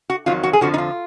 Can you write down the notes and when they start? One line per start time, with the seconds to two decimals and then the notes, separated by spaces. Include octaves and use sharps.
0.10 F#4
0.26 F2 D#3 F#3 F4
0.43 F#4
0.53 G#4
0.61 F2 D3 F3 F#4
0.74 D#4
0.78 F4